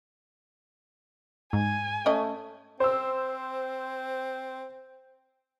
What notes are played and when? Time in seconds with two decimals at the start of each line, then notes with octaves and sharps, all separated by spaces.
1.53 G#2 G#5
2.06 A3 C#4 D#5
2.80 C4 C5 E6